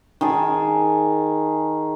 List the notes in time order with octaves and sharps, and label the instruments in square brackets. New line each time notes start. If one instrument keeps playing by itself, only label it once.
[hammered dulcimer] D#3 G#4 A5